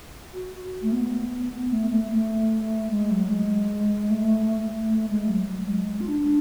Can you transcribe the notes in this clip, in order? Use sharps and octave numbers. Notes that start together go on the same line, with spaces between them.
F#4
A3
B3
A3
A3
A3
G#3
F#3
G#3
A3
A3
G#3
F#3
F#3
G#3
F4
D4